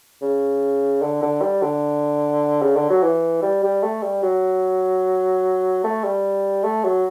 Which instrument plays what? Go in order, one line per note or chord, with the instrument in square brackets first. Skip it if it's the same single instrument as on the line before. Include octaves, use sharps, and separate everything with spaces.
[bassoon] C#3
D3
D3
G3
D3
C#3
D3
F#3
E3
G3
G3
A3
G3
F#3
A3
G3
A3
F#3